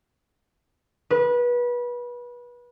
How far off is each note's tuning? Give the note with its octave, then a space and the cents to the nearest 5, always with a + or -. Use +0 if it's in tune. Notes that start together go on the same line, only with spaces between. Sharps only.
B4 -25